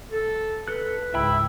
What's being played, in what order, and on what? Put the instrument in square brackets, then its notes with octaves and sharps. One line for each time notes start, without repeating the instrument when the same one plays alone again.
[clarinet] A4
[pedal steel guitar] A4 F#6 [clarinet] B4
[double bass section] C#2 G#2 [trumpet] E4 [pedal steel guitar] E5 G5 B5